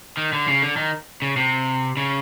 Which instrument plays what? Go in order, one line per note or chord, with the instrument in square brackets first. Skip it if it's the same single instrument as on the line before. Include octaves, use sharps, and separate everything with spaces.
[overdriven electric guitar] D#3
D3
C#3
D3
D#3
C#3
C3
C#3